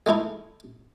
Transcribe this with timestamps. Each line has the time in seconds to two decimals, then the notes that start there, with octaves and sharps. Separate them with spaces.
0.06 G#3 A3 D#4 E4